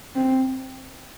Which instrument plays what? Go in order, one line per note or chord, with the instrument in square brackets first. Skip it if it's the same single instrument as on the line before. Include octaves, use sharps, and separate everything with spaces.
[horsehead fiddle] C4